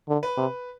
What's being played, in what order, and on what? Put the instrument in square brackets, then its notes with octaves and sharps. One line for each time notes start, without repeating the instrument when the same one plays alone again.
[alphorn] D3
[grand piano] B4
[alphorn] C3